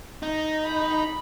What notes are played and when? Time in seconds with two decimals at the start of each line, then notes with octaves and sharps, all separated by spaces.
0.23 D#4
0.65 B5